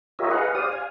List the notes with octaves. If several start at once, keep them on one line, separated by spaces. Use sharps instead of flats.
F4 G4 A#4 C#5 D#5 E5
G#4 B4 D#5 F5 F#5
G4 C5 D5 F5 D#6
F5 G#5